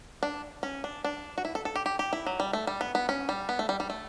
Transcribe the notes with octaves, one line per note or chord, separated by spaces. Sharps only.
D4
C#4
D4
D4
F#4
E4
A4
A4
G4
G4
G4
E4
F#3
G3
A3
G3
B3
B3
C#4
G3
B3
A3
G3
G3
A3